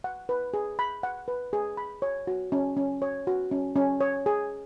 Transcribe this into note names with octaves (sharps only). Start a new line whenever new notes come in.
F#5
B4
G#4
B5
F#5
B4
G#4
B5
C#5
F#4
C#4
C#4
C#5
F#4
C#4
C#4
C#5
G#4